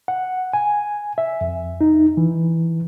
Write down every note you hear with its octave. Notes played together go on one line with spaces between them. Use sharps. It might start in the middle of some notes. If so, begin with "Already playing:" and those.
F#5
G#5
E5
F2
D#4
E3